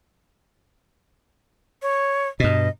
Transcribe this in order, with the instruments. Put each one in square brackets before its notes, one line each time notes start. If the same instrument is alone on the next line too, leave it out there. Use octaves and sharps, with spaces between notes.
[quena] C#5
[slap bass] G2 B2 [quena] D#5